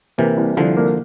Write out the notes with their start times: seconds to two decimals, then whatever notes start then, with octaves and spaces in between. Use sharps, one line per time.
0.18 C3 E3 A#3
0.38 C2
0.57 C2 D3 F3
0.77 A#3